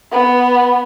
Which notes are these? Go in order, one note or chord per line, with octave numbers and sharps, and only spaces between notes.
B3